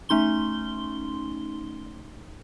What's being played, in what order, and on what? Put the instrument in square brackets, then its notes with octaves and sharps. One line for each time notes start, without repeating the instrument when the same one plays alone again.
[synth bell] A3 C#4 D#4 C6 G7